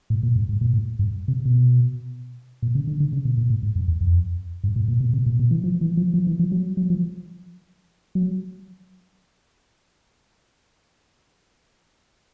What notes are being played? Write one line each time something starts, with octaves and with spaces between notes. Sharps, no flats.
A2
A#2
G2
G#2
A#2
A2
G2
C3
B2
A#2
C#3
D3
D3
C#3
B2
A#2
A2
G#2
F#2
E2
F2
G2
A2
A#2
B2
C3
A#2
B2
E3
F3
E3
F3
F3
E3
F3
F#3
F#3
F3
F#3